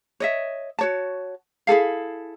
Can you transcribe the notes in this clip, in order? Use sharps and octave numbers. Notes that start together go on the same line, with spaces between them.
C#5 D#5 E5
F#4 C#5 A5
E4 G#4 A4 F5